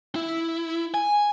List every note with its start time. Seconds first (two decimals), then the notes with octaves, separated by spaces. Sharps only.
0.16 E4
0.94 G#5